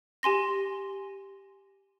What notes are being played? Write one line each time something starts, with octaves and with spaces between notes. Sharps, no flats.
G4 G#5 C6 A#6